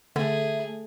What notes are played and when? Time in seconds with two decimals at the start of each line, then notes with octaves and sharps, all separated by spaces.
0.16 D3 A3 G#4 E5